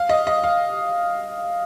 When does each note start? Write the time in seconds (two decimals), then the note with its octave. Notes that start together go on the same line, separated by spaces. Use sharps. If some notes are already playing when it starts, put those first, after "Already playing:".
Already playing: F5
0.09 D#5
0.27 D#5
0.44 F5